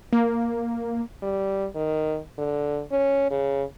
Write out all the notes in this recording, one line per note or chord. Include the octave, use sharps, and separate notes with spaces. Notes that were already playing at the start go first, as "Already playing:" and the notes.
A#3
G3
D#3
D3
C#4
C#3